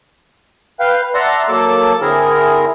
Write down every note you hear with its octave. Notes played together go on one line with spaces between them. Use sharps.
B4 F5 G5
D5 E5 F#5 A5 A#5 C6
F#3 A#3 A4 D6 E6
D3 C4 E4 G#4 A#4